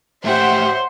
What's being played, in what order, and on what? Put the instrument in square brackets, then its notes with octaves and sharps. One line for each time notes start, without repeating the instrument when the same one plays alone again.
[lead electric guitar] A2 G4 [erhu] C5 [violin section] E5 F#5